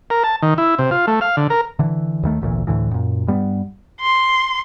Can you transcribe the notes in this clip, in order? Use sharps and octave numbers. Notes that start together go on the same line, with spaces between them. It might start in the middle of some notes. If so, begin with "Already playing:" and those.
A#4
A5
D#3
E4
C3
F4
A3
F5
D3
A#4
D3 E3
D#2 D#3 A3
G#1 D2 A#2 E3
D2 A2 D3 E3
F#2 A#2
G2 G3 B3
C6